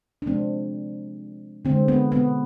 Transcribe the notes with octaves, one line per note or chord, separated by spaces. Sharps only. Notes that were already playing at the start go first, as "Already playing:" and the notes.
D4
C3 F3 G#3 C4
D3 G#3 C4
B3
B3